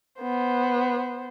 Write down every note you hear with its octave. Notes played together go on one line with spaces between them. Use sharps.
B3 C5